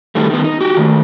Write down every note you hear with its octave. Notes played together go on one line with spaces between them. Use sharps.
A2 D#3 G3 A3
D#3 B3
D#4
F#4 G4
D#3 A3